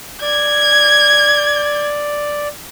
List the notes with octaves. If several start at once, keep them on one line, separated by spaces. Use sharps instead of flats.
D5 G#6